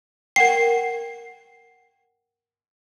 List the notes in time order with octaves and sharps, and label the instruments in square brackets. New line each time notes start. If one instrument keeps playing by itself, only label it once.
[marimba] A#4 F#5 G5 [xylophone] C7